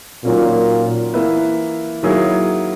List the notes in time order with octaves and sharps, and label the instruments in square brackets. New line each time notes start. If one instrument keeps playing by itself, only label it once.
[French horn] A#2 [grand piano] D#3 F#3 A#3 C#4
[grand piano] E3 A#3 E4 B4 E5
D#3 F#3 A#3 E4 G#4